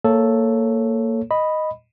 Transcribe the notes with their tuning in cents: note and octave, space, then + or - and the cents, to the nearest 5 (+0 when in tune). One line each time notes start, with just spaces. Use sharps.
A#3 -20 A4 +0 C#5 +0
D#5 +0 B5 +0